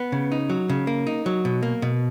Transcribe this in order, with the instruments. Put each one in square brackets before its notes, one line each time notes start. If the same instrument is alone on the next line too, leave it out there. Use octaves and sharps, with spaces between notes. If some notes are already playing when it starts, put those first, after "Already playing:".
Already playing: [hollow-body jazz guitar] B3
C#3
D#4
F#3
C#3
A#3
D#4
F#3
B2
A#3
B2